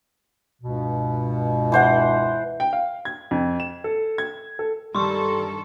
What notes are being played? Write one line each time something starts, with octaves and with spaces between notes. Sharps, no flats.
C#2 G2 B2
E3 C5 F#5
G5
F5
G#6
F2
E7
A4
G#6
A4
G2 D#3 G3 A4 C6 C#6